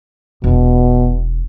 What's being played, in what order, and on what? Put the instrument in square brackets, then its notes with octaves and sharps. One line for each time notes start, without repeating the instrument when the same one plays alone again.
[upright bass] E1 [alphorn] B2